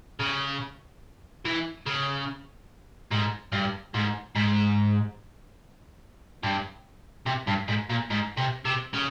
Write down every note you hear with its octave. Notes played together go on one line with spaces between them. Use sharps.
C#3
E3
C#3
G#2
G2
G#2
G#2
G2
C3
G2
G#2
A#2
G#2
C3
C3
C#3